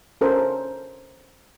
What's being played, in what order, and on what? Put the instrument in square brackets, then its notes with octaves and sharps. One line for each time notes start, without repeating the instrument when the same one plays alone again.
[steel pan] C#4 A4 A#4 C5